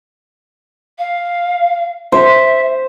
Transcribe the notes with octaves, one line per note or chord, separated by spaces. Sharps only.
F5
C5 E5